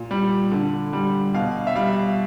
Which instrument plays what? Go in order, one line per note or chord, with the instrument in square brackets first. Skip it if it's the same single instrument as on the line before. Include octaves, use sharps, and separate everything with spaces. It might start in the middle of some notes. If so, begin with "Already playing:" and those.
Already playing: [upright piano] A#2
G3
D3
G3
B2 F5
E5
G3 F5